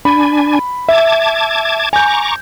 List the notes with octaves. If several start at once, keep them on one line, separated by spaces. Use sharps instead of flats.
D4 G#5 B5
E5 A5 D6 G#6
G#5 A#5 C#6 D6 G6